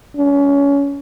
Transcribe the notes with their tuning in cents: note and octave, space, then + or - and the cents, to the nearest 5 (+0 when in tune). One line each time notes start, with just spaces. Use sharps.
C#4 +25